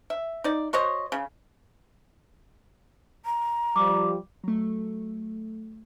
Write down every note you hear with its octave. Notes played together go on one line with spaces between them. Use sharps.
E5
D#4 D5
F#4 C5 C#5 D#5
C#3
A#5
F3 G3 D6
F#3 A3